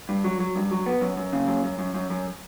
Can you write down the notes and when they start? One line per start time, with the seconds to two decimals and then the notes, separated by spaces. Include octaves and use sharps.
0.09 G2
0.24 F#3
0.40 F#3
0.56 G2
0.71 F#3
0.86 B3
1.01 F#2
1.17 F#2
1.33 C#3
1.48 F#2
1.64 F#2
1.79 F#2
1.94 F#2
2.10 F#2